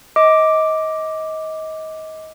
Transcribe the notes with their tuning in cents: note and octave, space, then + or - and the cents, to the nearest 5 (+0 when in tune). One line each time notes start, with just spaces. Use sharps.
D#5 +25 D6 +0